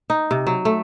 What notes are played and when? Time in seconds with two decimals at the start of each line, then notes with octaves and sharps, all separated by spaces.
0.10 D#4
0.31 C3
0.47 F#3
0.65 A3